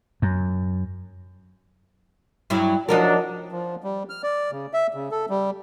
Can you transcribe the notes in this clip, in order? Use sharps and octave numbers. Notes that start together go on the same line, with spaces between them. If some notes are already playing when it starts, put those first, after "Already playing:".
F#2
G2 F#3 E4
F3 F#3 D4 D#4 F4 A#4
F3
G3
F6
D5
C#3
E5
C#3
A4
G3